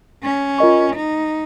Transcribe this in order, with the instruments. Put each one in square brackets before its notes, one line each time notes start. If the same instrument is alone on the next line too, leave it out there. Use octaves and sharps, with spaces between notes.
[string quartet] C#4
[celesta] F4 A#4 D#5 C#6
[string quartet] D#4